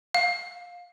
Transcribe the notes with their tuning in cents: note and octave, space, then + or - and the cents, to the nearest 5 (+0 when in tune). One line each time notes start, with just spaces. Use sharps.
F5 +20